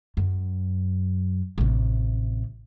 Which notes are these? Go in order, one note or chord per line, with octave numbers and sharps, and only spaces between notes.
F#2
A1 C3